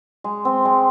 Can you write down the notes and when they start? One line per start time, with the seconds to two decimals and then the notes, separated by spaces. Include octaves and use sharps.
0.24 G#3
0.45 C4
0.65 G#3